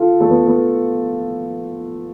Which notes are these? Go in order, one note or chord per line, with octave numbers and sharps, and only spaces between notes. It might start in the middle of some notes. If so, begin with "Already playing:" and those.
Already playing: F4 A4
A3
B3
B3